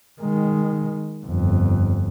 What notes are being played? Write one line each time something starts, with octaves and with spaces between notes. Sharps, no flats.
D#3 G#3
G1 F2